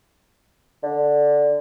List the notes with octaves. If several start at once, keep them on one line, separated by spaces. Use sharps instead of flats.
D3